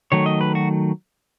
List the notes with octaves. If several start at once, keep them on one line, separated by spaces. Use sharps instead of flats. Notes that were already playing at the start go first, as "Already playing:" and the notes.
D#3 F#3 A3 C#5
D#5
B4
F#4